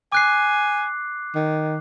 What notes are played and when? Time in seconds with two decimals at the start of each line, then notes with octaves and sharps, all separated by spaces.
0.12 G#5 D6 F#6 C7
1.35 D#3